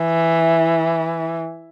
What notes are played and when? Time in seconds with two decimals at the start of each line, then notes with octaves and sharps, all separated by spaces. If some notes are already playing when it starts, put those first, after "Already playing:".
Already playing: E3